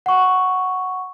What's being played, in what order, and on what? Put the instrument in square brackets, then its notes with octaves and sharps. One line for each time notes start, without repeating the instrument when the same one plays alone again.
[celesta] F#5 C#6